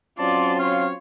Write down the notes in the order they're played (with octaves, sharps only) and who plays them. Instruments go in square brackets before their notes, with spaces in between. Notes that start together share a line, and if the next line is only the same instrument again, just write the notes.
[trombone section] F#3 C4 C#4 [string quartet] F4 C6 [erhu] D5 [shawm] A5
[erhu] C#5 [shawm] F5